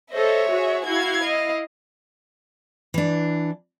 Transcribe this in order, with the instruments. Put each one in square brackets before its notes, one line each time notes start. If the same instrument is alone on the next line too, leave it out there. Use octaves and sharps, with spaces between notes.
[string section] A4 C5 D#5 [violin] C#5 E5
[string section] F#4 G#4
[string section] E4 F5 [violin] F#4 G#6
[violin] D#5
[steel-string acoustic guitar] E3 D4